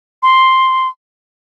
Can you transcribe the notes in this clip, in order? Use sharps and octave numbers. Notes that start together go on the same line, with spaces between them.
C6